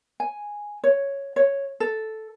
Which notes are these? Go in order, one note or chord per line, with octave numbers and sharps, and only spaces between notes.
G#5
C#5
C#5
A4